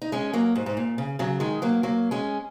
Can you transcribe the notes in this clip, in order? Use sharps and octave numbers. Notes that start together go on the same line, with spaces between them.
D#4
G#3 C#4
F#3 A#3
G#2
G#2
A#2
C#3
C#3 F#3
D#3 G#3
F#3 A#3
F#3 A#3
G#3 C#4